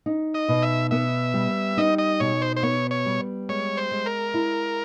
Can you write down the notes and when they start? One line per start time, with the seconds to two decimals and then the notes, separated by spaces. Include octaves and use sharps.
0.06 D#4
0.34 D#5
0.49 B2
0.62 E5
0.91 B3 E5
1.34 G3
1.77 D#4 D#5
1.98 D#5
2.20 B2 C#5
2.42 C5
2.57 C5
2.63 B3 C#5
2.91 C#5
3.06 G3
3.49 G#3 C#5
3.77 C5
3.91 G#3
4.06 A#4
4.34 E4